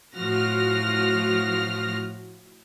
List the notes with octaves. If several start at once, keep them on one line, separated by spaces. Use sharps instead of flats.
A2 F3 F#4 F6 A#6